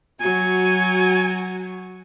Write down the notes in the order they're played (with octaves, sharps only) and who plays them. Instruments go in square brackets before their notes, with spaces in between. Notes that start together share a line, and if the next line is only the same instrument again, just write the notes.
[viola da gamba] F#3 F#4 [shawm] G#5